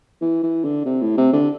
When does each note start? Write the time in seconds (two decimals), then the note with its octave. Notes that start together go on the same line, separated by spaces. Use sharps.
0.21 E3
0.43 E3
0.64 D3
0.85 C3
1.01 A2
1.17 C3
1.33 D3